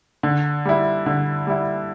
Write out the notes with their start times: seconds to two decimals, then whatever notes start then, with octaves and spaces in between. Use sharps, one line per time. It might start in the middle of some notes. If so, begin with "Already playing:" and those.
0.23 D3
0.65 G3 E4
1.06 D3
1.47 G3 E4